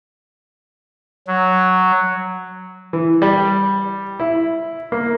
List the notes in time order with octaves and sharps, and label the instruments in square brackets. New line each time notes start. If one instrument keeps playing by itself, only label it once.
[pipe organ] F#3
[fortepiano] E3
G3
E4
A#3